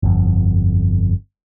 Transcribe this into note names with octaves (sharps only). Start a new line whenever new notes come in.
G1 F2